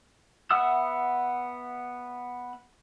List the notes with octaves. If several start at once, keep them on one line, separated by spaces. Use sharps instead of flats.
B3 E5 F#5 D#6 E6